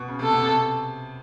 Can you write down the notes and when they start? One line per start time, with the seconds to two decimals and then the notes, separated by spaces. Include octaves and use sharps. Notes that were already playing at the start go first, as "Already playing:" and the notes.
Already playing: B2
0.08 C#3
0.19 C3 A4
0.32 B2
0.42 C3